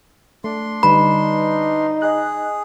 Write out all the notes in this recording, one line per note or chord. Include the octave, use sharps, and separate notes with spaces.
A3 D4 C6
D3 G3 D#4 B4 B5
G#4 D#5 F#6